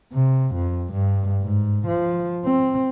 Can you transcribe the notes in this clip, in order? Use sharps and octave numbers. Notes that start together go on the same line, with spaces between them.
C3
F2
G2
G#2
F3
C4